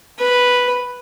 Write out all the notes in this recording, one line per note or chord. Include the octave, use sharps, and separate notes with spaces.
B4